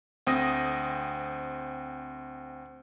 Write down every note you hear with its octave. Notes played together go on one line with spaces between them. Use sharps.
D2 C4 D#6 A#6